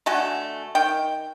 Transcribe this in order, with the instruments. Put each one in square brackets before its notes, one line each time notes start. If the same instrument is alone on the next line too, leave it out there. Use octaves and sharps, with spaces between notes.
[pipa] D3 A3 F#4 G#5
D#3 G5